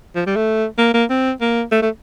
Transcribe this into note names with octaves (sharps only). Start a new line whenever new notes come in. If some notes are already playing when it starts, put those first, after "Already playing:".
F3
G3
A3
A#3
A#3
C4
A#3
A3
A3